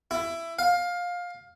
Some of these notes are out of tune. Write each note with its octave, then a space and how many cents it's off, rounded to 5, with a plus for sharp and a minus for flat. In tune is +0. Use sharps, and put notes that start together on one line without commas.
E4 +15
F5 +20